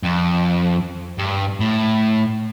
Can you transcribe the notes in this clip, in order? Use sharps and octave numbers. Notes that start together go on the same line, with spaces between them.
F2
G2
A2